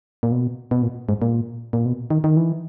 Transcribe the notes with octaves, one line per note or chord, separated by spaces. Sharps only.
A#2
B2
B2
A#2
G#2
A#2
A#2
B2
D#3
D#3
E3